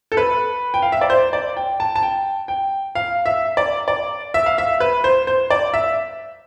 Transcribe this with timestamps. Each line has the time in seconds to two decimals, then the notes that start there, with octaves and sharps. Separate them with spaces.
0.12 A4
0.17 B4
0.74 G5
0.82 F5
0.92 E5
1.01 D5
1.10 C5
1.33 D5
1.57 G5
1.80 A5
1.96 A5
2.03 G5
2.48 G5
2.95 F5
3.26 E5
3.57 D5
3.88 D5
4.34 E5
4.46 F5
4.58 E5
4.80 B4
5.04 C5
5.27 C5
5.50 D5
5.74 E5